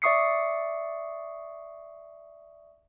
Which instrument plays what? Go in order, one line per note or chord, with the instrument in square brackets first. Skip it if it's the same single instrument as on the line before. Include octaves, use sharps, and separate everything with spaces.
[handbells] D5 E5 C#6 D#6 C7 C#7